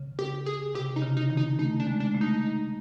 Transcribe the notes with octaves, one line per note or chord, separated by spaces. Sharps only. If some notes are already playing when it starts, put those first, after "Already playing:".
Already playing: C#3
G4
G#4
C3 G4
D#4
C#3
D#4
D#3
D#4
A3 D#4
D4
G#3
D4
A3
D#4